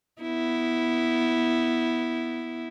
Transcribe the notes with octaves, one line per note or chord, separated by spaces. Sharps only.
B3 E4